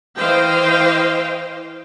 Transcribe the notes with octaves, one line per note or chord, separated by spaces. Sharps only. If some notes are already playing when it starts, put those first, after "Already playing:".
E3 C5 D#5 F5 G5